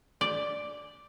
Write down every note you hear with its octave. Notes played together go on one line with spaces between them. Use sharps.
D5